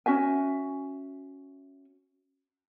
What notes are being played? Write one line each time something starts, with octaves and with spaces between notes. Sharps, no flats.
C#4 F#4 E5 G#5